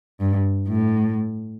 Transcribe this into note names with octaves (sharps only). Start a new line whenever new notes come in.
G2
A2